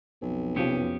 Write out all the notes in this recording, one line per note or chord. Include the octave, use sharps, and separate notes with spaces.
B1 F2
F2 C3 F3 B3 C#4 G4